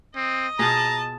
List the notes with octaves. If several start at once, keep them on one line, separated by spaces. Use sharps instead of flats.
C4 D#5
B2 F4 G#4 A5 A#5